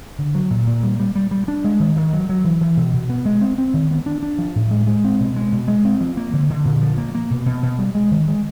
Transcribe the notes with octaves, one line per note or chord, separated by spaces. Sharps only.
D3
F#3
A#2
A#2
G3
G3
G3
G3
D4
G#3
D#3
D#3
F#3
F#3
E3
E3
B2
B2
B3
G#3
C4
C4
D#3
B3
D4
D4
F3
A2
G#3
G#3
C4
B2
G#3
B2
G#3
C4
F3
A#3
D3
D3
A#2
F3
A#3
A#3
B2
B2
B2
G3
G#3
D#3
G#3